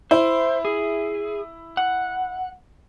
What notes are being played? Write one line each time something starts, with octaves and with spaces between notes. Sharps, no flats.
E4 C5
G#4
F#5